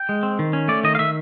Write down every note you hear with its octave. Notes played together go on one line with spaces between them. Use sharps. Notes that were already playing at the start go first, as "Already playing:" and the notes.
Already playing: G5
G#3
C4
D#3
C#4
A3 D5
D#3 D#5
F5
D#3 E5